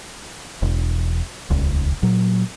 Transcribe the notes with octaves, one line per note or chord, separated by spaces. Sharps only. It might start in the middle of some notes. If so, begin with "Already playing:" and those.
E1
D#1 C#2
A#2 F#3